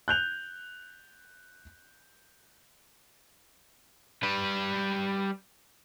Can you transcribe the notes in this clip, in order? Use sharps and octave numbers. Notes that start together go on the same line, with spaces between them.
F#6 G6 F7
G3 B4